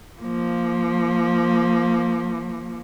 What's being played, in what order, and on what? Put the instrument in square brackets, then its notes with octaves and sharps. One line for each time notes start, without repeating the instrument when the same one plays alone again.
[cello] F3 A#3